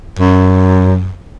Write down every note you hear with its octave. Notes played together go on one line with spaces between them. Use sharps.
F#2